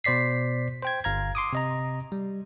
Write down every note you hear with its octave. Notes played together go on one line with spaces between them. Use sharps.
B2 C5 D5 B6 C7
C5 G5 G#6
G1 F5 A#5 G#6
C6 D6 D#6
C3 D#5 A#5
G3